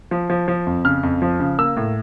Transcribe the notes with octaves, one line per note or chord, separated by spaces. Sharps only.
F3
F3
F3
F2
C#3 F6
F2
F3
C#3
A#3 E6
A2